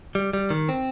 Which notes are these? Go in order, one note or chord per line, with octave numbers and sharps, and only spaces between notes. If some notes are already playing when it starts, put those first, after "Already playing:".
G3
G3
D#3
C4